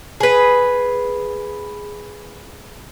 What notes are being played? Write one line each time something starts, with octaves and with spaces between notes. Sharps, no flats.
G#4 B4